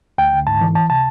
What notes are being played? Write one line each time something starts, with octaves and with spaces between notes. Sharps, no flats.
D2 G5
D3
G#2 A5
E3
C#2 A5
C3 A5